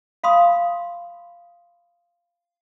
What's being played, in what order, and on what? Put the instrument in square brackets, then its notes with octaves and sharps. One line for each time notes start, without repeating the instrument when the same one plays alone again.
[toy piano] F5 B5 C6 D#6